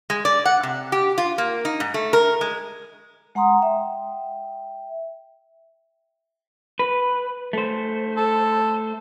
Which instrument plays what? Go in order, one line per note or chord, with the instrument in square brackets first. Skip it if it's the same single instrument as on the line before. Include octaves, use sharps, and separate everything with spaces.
[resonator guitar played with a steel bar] G#3
D5
F#5
C3
G4
F4
A#3
D#4
G#2
A3
A#4
G#3
[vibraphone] G#3 F#5 A#5 C6 D#6
E5 G5
[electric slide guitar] B4
A3 C5
[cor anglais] A4